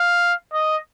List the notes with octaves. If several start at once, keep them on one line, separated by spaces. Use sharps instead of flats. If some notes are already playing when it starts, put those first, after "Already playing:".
Already playing: F5
D#5